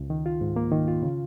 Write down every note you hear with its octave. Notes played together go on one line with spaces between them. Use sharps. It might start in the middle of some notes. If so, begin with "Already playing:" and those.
Already playing: C#2
D#3
F4
G#2
A#3
D#3
F4
C#3